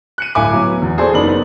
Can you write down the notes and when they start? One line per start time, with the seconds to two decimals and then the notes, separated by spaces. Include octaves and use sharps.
0.18 F#6 C#7 D#7
0.35 D1 G2 E5 G#5 D6
0.53 F#3 B3
0.82 E2
0.98 F#4 G#4 A4 C5 D5
1.13 F#1 B3 D#4 D5 B5 F#7